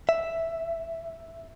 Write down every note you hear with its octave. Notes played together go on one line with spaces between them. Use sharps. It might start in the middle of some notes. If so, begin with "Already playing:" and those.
E5